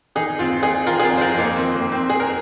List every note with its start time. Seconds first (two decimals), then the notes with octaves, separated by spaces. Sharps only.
0.15 D#3 D#4 G#4
0.39 D#2 C4 F4
0.62 D#2 D#4 G#4
0.87 D#3 F4 A#4
1.00 G#4
1.03 C4 F4
1.10 F2
1.17 C5
1.21 F4 A#4
1.33 F2
1.38 A#3 D#4
1.57 D#3 C4
1.75 A#3
1.80 F2
1.92 C4
2.03 F2
2.10 G#4
2.20 A#4